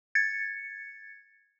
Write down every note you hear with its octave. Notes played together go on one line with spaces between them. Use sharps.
G#6 A6 C#7